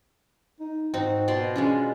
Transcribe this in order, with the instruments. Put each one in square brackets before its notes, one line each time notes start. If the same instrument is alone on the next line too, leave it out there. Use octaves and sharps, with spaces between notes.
[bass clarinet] D#4
[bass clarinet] G#2 [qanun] C4 D#4 F#4
[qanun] B2 D5 C6
[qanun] G#3 D4 F4 [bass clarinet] C#4